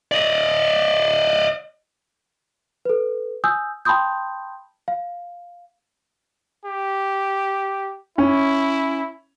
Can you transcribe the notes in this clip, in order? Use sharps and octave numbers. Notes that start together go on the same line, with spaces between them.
D5 D#5
A4 B4
G#5 D#6 E6 G6
G5 A5 B5 C6 D#6 G6
F5
G4
C#4 E4